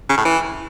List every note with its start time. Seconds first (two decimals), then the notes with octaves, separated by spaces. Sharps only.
0.10 C#3
0.17 A2
0.25 E3